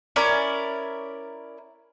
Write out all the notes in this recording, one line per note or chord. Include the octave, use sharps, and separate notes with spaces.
C#4 E4 A#4 D5